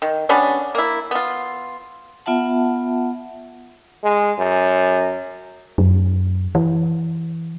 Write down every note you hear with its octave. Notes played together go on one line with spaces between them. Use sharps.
D#3
G3 B3 C#4 D4
A#3 E4
B3 F4
B3 F4 E5 F#5 A5
G#3
F#2
F#2
E3